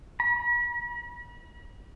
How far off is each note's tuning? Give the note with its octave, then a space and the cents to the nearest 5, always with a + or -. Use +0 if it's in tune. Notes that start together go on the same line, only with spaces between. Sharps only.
B5 -40